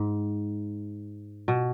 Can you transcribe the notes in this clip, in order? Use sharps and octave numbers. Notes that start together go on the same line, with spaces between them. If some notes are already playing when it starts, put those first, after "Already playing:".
Already playing: G#2
B2